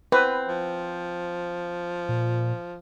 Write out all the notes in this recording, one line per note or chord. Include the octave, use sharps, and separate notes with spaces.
C4 B4
F3
A#2